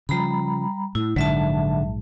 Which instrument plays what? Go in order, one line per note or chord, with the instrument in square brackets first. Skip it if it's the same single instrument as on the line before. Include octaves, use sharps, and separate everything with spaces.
[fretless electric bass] C#3 F3 [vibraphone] G3 A#5 B5
[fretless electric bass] A2 [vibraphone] E4
[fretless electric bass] A#1 G#2 [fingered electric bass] D3 [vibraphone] F#3 E5 A5